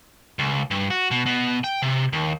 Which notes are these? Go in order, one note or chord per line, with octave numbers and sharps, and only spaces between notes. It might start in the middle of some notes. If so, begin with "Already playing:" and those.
C#2
G2
F#4
B2
B2
G5
C3
D#2